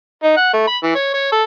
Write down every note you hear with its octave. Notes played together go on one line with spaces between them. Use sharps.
D#4
F#5
A3
B5
E3
C#5
C#5
A4